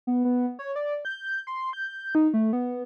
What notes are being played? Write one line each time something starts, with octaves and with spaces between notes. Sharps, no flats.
B3
B3
C#5
D5
G6
C6
G6
D#4
A3
B3